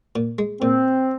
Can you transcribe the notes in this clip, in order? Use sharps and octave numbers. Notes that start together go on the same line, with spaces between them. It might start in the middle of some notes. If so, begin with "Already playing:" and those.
A#2
G#3
A#2 C4